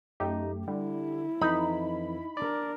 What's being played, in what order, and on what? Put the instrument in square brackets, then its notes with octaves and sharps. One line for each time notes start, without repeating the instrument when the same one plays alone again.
[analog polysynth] F#2 A3 G4 [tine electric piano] D#4
[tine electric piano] D3 [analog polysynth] G3 [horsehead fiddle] E4
[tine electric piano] F2 E3 [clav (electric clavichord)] D#4 [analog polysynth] B5
[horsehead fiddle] D4 A#4 [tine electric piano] D5